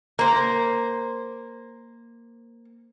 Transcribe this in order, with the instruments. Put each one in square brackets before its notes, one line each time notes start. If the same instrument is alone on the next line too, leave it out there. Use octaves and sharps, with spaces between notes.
[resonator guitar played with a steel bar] A#3 C5